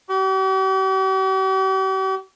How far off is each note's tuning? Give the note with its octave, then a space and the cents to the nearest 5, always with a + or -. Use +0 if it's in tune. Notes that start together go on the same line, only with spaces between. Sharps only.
G4 -45